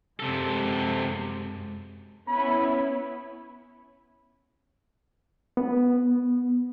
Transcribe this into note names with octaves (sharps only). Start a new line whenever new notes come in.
F#2 C3 G#3 A4
B3 C#4 E4 B5
B3